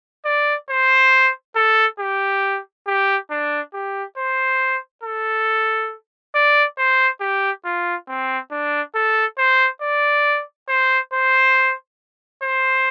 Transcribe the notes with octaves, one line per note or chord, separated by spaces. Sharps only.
D5
C5
A4
G4
G4
D4
G4
C5
A4
D5
C5
G4
F4
C4
D4
A4
C5
D5
C5
C5
C5